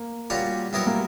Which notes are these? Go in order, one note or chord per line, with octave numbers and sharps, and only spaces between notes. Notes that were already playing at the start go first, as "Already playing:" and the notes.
Already playing: A#3
A#2 G3 C#4 F#4 C#5
F#3 G3 B3 E4 A#4 C#5
A#3